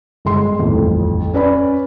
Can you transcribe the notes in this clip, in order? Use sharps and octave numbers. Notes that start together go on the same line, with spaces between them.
G1 G#3 C6
D#1 A1 F2
C#4 B4 D5 B5